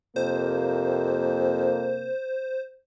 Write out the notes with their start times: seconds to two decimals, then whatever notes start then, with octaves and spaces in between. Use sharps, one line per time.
0.16 F2 C3 A#3 C5